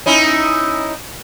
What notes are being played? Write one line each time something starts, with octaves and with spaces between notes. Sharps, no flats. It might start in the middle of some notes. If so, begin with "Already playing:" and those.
C#4 D#4 E4